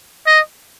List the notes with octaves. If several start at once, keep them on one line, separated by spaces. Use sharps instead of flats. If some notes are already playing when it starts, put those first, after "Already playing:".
D#5